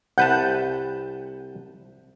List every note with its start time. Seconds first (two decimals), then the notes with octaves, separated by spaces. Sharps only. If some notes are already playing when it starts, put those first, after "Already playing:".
0.18 C2 B4 F#5 A5 G6